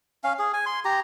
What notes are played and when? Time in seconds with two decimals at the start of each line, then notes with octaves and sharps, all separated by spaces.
0.24 C#4 F5
0.39 G#4
0.53 G#5
0.66 C6
0.85 G4 A#5